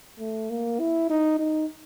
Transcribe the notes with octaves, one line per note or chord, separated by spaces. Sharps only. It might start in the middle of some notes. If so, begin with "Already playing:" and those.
A3
A#3
E4
D#4
D#4